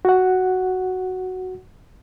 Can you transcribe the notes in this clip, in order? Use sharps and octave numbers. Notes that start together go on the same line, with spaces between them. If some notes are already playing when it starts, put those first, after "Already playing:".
F#4 F#5